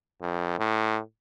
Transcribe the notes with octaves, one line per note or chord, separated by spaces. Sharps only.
F2
A2